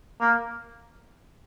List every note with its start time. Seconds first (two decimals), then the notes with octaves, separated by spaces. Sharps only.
0.21 A#3